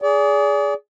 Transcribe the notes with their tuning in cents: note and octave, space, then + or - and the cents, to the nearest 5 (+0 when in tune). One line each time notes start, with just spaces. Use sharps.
G#4 +0 D5 -35